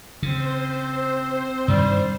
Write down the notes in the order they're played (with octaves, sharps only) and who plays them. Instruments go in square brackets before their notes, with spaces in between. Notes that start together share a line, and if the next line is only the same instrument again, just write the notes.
[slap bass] C#3 [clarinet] C4 [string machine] C5
[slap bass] G2 C3 D#3 [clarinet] G3